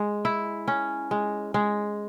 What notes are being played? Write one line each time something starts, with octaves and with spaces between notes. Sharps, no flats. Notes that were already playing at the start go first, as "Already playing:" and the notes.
Already playing: G#3
E4
C#4
G#3
G#3